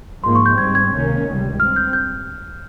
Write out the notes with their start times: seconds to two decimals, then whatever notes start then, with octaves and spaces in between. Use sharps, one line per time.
0.23 G#2 F3 A#3 C6
0.35 C#6
0.46 G6
0.57 G#2 G3 C4 G#6
0.75 G#6
0.91 C#2 C3 D#3 A#3 C#4
1.26 C#2 C3 G3
1.59 G2 G3 C4 F6
1.76 G6
1.93 G6